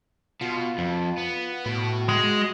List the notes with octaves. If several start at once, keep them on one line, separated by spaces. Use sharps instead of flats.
B2 F4
F2
B3
A2 F#4 B5
G#3